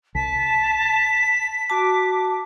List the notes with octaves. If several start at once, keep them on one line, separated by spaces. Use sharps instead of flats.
C2 A5 B6
F#4 A5 D6